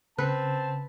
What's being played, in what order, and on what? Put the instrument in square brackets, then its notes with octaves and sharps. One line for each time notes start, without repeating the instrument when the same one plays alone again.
[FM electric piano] C#3 [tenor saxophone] C4 [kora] B4 [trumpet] A5